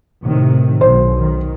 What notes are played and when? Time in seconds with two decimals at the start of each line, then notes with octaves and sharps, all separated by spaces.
0.22 A2 C3 D#3
0.81 B1 C5
1.16 D#3